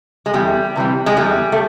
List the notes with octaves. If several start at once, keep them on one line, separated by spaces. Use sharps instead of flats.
G#3
E2 G3
C3 E3 G3
G#3
E2 G3
A3